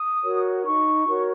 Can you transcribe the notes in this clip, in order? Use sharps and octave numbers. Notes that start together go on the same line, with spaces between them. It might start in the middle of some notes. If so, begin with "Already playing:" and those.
Already playing: D#6
F#4 A#4 C#5
D#4 C#6
F#4 A#4 C#5